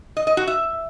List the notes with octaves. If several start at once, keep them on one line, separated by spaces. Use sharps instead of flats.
D#5
D#5
F#4
E5